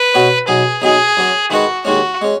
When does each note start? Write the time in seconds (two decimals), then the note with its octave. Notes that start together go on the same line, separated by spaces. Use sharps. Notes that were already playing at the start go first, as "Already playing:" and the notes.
Already playing: B4
0.14 B2 B3 F#4 C#5
0.48 B1 B2 F#3 G#4
0.82 B1 B2 F#3 D#4 G#4
1.17 F#2 F#3 C#4
1.51 D#3 G#3 D#4 F#4 B4
1.85 D#2 D#3 G#3 C#4 F#4
2.22 G#3 C#4